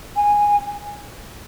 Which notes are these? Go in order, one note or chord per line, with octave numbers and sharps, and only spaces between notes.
G#5